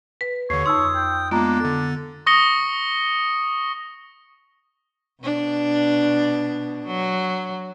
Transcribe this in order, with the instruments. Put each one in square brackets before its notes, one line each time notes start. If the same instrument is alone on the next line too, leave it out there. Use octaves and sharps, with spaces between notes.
[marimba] B4 [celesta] B6
[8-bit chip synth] D#2 D3 [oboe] C#5 [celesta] C7
[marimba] F2 D#4 [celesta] C6 E6 [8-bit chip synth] D#6
[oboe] G5
[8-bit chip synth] G#3 A#3 [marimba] B3 [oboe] D4 [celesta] F4 A#5
[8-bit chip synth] D3 A6 [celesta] A4
[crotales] C#6 D#6 A#6 C#7 G7
[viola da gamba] B2 D4
F#3